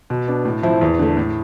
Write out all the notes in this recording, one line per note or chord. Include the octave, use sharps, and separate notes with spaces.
B2
B3 D4
A2
F3 C4 E4
E2
D3 A3
A2